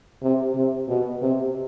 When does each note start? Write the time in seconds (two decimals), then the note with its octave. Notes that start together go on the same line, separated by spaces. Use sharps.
0.23 C3
0.55 C3
0.89 B2
1.22 C3